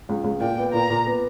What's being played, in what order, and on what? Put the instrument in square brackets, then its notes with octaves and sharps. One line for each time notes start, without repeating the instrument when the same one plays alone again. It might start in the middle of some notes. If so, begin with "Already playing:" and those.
[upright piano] C#2
C#2
[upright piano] A#2 [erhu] G5
[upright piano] B3
[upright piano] A#2 [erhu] A#5
[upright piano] A#2
B3